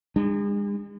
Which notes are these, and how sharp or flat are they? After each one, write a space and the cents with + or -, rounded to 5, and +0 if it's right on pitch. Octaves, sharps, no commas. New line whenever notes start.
G#3 -40 D4 +35